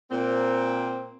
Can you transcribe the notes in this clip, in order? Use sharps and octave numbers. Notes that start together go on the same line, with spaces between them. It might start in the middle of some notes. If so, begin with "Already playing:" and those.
A#2 C4